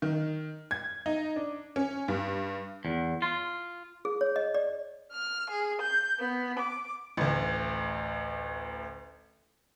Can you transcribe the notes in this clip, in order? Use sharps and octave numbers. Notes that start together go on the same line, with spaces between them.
D#3
G#6
D#4
D4
C#4
G2
E2
F4
G#4
C#5
D#5
D5
F6
G#4
G6
B3
D6
A1 D2